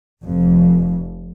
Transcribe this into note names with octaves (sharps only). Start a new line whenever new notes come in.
F1 F2